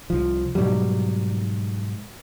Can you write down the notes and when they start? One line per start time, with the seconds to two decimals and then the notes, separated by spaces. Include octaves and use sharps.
0.10 C2 F3
0.55 G#2 B2 F#3 G3